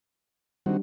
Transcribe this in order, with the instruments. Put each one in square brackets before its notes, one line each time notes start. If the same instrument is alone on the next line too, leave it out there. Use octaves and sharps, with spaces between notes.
[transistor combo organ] D#3 C4 F#4 [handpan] G3 D4